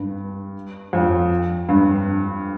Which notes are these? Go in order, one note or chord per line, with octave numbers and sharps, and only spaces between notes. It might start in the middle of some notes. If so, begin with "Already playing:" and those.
Already playing: G2
F2
G2